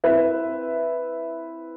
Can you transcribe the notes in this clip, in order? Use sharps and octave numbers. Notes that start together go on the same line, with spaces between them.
C4 E4 B4 E5